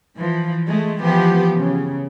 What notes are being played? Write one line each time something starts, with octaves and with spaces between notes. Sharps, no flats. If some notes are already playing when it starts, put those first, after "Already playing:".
E3 F3
G#3 A3
E3 F3 B3 G4
C#3